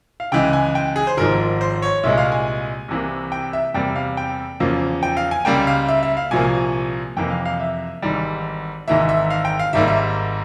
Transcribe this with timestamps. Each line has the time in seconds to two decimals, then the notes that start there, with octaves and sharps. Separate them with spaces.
0.20 F5
0.32 C#2 C#3 E3 G#3 G5
0.53 G#5
0.75 G5
0.96 G#4
1.07 C5
1.17 G#1 G#2 F3 A#4
1.61 C5
1.82 C#5
2.03 C2 A#2 G#3 E5
2.18 F5
2.32 G#5
2.88 C2 C3 E3 A#3
3.32 G5
3.53 E5
3.74 E2 C3 G3 A#3 G5
3.96 F5
4.17 G5
4.60 E2 C#3 F3 A#3
5.03 G5
5.17 F5
5.31 G#5
5.45 C#2 C#3 G3 A#3 G5
5.67 F5
5.88 E5
6.03 E5
6.17 F5
6.31 C2 A#2 F3 A#3 G#5
7.17 F2 C3 E3 A#3 G5
7.30 F5
7.45 F5
7.60 E5
8.02 G#1 G#2 E3 G3
8.88 G#1 G#2 E3 A#3 E5
9.09 E5
9.30 F5
9.45 G5
9.59 F5
9.73 G#1 G#2 G3 A#3 E5
9.88 E5